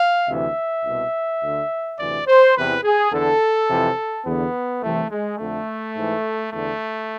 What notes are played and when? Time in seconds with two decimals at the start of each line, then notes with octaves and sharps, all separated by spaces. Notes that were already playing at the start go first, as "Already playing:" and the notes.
Already playing: F5
0.28 D2 C3 E3 E5
0.85 C2 B2
1.41 D2 D3
1.98 D2 C3 E3 D5
2.27 C5
2.55 E2 C3 E3 B4
2.83 G#4
3.11 E2 D3 A4
3.69 F2 C3 E3
4.25 E2 D3 B3
4.81 C2 C3 E3 A3
5.10 G#3
5.38 F2 D3 A3
5.95 G#2 E3
6.52 E2 D3 A3